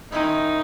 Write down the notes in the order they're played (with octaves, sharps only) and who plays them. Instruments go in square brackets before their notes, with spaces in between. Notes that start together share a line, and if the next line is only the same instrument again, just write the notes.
[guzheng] D#3 G#3 C#4 E4 [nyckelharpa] D#4